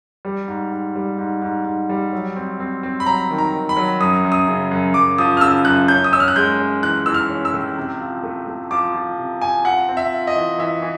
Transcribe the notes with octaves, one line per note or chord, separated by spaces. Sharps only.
G3
G#2
G#2
G3
G#2
G#2
G#2
G3
F#3
C4
C4
C4
B5
F#3 A#5
D#3
A#5
D#3
B5
F#3
F#2 D#6
F#2
D#6
C#3
F#2
F#2 D6
F3 D#6
F6
C#3 E6
F#2 F#6
C#4 G6
D#6
C#4 E6
F6
F#6
G#3 G6
C#4
E3 F#6
E3 E6
F6
C#4
E6
A2
C3
F3
A3
A3
F3 D6
F3
C3
C3 G#5
F4 F#5
C4
E5
F4
D#5
E3
E3 E5
E3